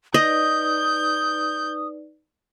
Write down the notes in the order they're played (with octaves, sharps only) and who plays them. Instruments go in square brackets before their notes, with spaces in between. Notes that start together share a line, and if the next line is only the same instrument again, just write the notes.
[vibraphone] D#4 B4 D5 [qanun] D#5 [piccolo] D#6 [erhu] G6